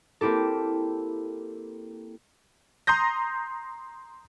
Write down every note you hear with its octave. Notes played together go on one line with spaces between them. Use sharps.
A#3 C4 E4 G4 A4
A#5 C6 D#6 G6 A#6